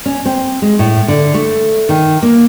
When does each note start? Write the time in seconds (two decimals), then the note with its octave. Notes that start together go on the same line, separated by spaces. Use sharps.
0.06 C#4
0.25 C4
0.62 G#3
0.79 A2
1.08 D3
1.34 A3
1.89 D#3
2.22 A#3